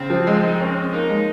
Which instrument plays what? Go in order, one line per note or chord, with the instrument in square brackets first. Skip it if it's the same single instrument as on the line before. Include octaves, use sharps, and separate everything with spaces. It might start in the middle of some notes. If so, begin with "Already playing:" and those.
Already playing: [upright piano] C#3 [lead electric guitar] C4
[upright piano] F3
G#3
D#4
C#4
[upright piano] A#3 [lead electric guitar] D#4
[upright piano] G#3